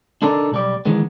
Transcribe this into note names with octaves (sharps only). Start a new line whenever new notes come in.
D4 D#4 A4 A#4 D5
B1 G3 D5
D#3 E3 G#3 B3